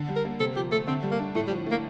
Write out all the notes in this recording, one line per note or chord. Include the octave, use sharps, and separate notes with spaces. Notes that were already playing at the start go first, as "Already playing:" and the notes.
Already playing: D3
G3
A#4
A#3
C3 A4
F3 G4
A3 A4
D3 C4
G3
A#3
D4
A2 A3
G3
F3
A3 A#3